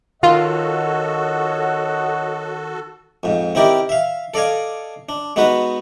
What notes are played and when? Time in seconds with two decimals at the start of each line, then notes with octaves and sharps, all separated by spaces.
0.23 D#3 F4 F#4 A4 C#5 D#5 F#5
3.23 F2 G#2
3.55 C4 D#4 E4 G4 A#4 D5
3.89 E5 F5
4.34 A4 D5 D#5 F5 G#5
5.09 D4
5.36 G#3 B3 D#4 F#4 B4